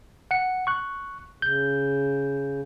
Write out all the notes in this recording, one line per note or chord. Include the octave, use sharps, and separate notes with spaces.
F#5 C#7
C#6 F#6
C#3 G6